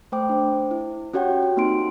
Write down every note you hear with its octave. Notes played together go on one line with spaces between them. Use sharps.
A3 C5 G5 D6
D4 C5
E4
C#4 F#4 G4 C#5 F#5 G5
F#4
A#3 C4 D#4 C6 D7